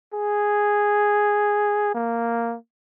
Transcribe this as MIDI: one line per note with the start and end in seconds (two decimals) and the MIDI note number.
0.14 1.91 68
1.95 2.56 58